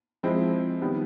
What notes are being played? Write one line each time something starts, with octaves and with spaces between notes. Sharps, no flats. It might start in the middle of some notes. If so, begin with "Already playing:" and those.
F3 G#3 C4 E4
D#3 G3 B3